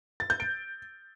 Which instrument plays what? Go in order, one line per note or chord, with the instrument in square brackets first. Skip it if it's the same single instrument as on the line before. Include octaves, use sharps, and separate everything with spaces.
[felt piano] A6
G6
D7